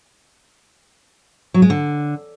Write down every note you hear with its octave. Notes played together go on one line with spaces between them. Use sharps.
F#3
G#3
D3